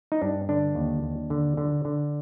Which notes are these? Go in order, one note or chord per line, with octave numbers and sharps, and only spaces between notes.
D#4
G2 D4
D3 D4
D#2
D#2
D3
D3
D3